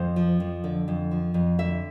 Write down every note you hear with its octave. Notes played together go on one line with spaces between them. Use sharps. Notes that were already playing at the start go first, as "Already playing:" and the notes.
Already playing: F2 C5
F3
F2
D3
F2
F3
F2
D3 E5